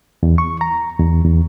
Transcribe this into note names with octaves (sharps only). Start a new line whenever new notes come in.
E2
C#6
A#5
E2
E2